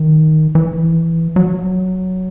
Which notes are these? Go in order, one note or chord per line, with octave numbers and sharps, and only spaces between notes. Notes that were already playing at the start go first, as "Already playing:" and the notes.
Already playing: D#3
E3
F#3